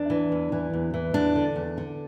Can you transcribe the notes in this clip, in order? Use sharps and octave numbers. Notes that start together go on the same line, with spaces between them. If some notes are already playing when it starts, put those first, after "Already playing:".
Already playing: E2 D4
E3
E2
E3
E2
E3
E2 D4
D3
E2
D3